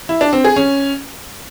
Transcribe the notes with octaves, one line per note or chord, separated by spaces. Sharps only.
E4
D4
C4
G#4
C#4